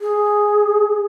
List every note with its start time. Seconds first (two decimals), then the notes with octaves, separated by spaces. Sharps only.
0.01 G#4